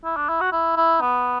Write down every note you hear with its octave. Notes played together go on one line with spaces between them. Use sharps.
E4
D4
E4
F#4
E4
E4
B3